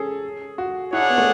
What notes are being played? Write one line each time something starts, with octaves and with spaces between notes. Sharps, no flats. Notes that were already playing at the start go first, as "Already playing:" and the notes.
Already playing: C#4 G#4 A4
F#4
D4 E4 G#4 C#5 F#5
B3
A3